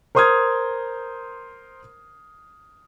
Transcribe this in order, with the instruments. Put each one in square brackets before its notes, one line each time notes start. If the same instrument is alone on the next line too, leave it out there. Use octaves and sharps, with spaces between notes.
[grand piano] A#4 C5 C6 D#6 F6 G#6